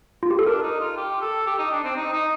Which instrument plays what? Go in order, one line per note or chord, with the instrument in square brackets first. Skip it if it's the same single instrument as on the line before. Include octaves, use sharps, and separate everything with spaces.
[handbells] F4
G4
A4
[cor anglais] D4 [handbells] A#4
[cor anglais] D#4
F4
G4
A4
G4
D#4
D4
C4
D#4
D#4